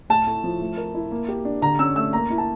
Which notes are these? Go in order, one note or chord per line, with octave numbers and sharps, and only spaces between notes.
A2 A5
A3
F3
A3
A#4
E4
A#3
G4
D4
D3 A#5
C#4 E6
A3 E6
A#3 A#5
E4
A5